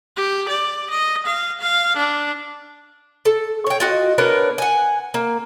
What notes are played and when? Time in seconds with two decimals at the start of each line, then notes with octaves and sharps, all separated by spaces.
0.17 G4
0.49 D5
0.90 D#5
1.26 F5
1.61 F5
1.97 D4
3.25 A4
3.67 C#5 G5
3.80 F4 F#4 D#5
4.18 B3 D4 A#4 C#5
4.58 F#5 G#5
5.14 A#3